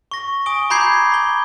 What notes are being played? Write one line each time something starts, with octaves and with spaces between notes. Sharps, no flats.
C#6 A#6
G#5 D#6 D7 G7
A#5 B5 D6 G6 G#6 C7
B5 G7